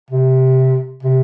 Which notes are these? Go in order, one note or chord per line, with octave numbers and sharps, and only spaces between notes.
C3
C3